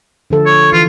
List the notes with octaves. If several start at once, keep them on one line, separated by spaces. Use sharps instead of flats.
D3 F3 A4
C#5
E3 F4